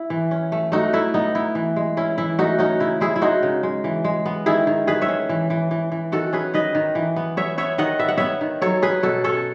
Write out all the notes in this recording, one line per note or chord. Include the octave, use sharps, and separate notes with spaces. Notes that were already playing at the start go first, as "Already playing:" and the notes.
Already playing: E4
E3
C#4
A3
A3 D#4 F#4
A3 E4
B3 D#4
B3 E4
E3
G#3
C#4 E4
E3 E4
A3 D#4 F#4
C#4 D#4 F#4
C#3 E4
G#3 E4 G#4
E4
G#3 D#4 F#4
C#3
G#3
E3
G#3
B3
D#3 E4 G#4
D#3
D#3 G#4 B4
C#5 E5
C#4
E3
E3
E3
E3
D#3 F#4 A4
C#4 G#4 B4
D#3 B4 D#5
D#3
E3
B3
B3 C#5 E5
B3 C#5 E5
D#3 D#5 F#5
B3 E5
F#5
B3 C#5 E5
D#3
F#3 A4 C#5
C#4 G#4 B4
B2 F#4 A4
C#4 A4 C#5